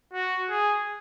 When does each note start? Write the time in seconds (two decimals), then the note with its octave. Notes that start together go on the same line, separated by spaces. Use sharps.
0.13 F#4
0.50 G#4